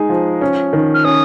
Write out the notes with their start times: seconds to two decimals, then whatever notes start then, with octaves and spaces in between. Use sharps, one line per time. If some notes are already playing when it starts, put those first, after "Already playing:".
Already playing: G#3 D#4 G#4
0.09 F3
0.41 C#4
0.73 D#3
0.94 F6
1.05 C#4 D#6